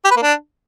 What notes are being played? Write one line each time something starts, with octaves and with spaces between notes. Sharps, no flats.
G4
B4
A#3
D4